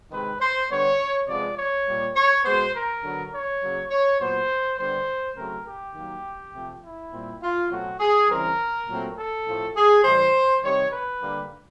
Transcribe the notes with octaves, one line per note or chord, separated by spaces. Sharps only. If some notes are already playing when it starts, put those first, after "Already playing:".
C3 D#3 G#3 C4 B4
C5
D3 G3 B3 C#5
C3 F3 G#3 B3 D5
C#5
A#2 G3 A#3
C#5
B2 G#3 B3 C5
A#4
D3 F#3 B3
C#5
C#3 F#3 A#3
C#5
A#2 F#3 B3 C5
D3 G3 B3 C5
C#3 F#3 A3 C4 A#4
G4
D#3 F#3 A#3
C3 F3 A3
E4
A#2 G3 C4
F4
B2 F#3 A3 C4 F#4
G#4
C#3 E3 G3 C4 A#4
A#2 F#3 A3 C4
A4
A2 F3 A3 C4
G#4
A2 E3 G3 C5
C3 D#3 G3 C#5
B4
D3 G3 A#3